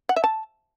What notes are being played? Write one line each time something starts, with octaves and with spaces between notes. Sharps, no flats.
F#5
E5
A5